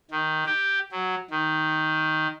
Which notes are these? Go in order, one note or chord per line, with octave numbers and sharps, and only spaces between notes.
D#3
G4
F#3
D#3